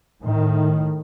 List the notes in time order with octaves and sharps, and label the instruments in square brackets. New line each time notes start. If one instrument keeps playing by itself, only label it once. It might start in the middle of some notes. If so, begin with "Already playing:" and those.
[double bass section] A2 D#3